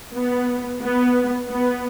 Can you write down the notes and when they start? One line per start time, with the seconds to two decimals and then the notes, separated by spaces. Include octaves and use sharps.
0.14 B3
0.82 B3
1.48 B3